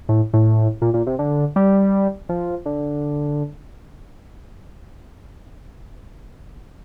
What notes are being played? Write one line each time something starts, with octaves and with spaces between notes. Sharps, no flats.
A2
A2
A#2
A#2
C3
D3
G3
F3
D3